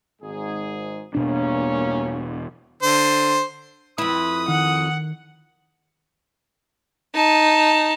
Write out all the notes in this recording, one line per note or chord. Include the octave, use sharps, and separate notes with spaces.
G#1 G#2 G#4
E1 G2 B2 A#3 C#4 D4
D3 C5
F2 E4 B4 D#6
D#3 F#5
D#4 A5